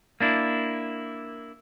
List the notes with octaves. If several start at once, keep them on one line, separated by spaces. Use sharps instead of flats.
A#3 D4 E4